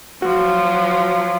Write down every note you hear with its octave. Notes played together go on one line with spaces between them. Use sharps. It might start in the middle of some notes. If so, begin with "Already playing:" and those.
F3 F#3 F#4